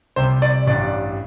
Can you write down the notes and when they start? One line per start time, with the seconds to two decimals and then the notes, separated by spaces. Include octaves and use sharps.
0.16 C2 C3 G3 C5
0.42 D5
0.67 A1 G2 G3 D5